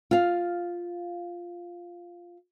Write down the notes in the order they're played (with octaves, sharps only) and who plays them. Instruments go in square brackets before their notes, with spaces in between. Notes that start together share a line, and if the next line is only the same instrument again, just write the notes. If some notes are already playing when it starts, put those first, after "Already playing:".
[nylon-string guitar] F4 F5